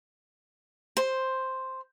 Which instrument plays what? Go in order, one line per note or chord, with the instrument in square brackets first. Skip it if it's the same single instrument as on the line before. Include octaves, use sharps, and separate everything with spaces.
[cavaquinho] C5